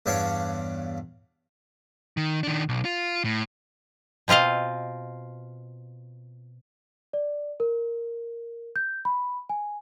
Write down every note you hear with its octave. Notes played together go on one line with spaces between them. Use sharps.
E2 G2 D4 C#5 F5
D#3
D#3 D4
B1
F4
A2
B2 C4 F4 D#5 F5
D5
A#4
G6
B5
G#5